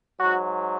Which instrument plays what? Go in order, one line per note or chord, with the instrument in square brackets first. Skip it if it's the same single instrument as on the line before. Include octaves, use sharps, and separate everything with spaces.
[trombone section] G#2 F#3 F#4